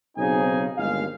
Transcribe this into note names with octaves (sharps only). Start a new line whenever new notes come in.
B1 C#3 C4 D#4 G#4 G#5
G1 D#2 G#3 F5